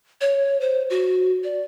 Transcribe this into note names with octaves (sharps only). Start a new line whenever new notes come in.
C#5
C5
F#4
D5